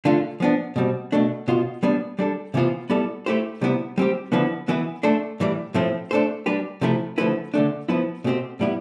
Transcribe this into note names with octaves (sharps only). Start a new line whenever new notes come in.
D3 A3 D4 F4
F3 B3 D4
B2 G3 C4
B2 A3 D4
B2 B3 F4 C5
G3 B3 D4
G3 D4 A4
C3 E3 B3 F4 C5
G3 B3 E4 A4
A3 E4 G4 C5
C3 G3 B3 E4
G3 C4 G4
D3 F3 B3 E4 B4
E3 B3 E4 B4
A3 D4 A4 C5
A2 E3 G3
A2 F3 A3 C4 E4
A3 D4 A4 C5
G3 D4 G4 B4
C3 F3 A3 E4
D3 F3 A3 E4 B4
D3 A3 D4
F3 B3 E4 B4
B2 A3 C4 G4 C5
A2 G3 B3 E4